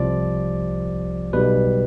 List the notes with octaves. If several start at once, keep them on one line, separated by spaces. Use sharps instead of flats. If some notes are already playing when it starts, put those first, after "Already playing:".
Already playing: C2 C3 F3 D5
B1 B2 G3 B4